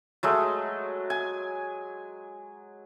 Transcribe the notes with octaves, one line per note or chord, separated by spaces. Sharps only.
F#3 G#3 A3
G#5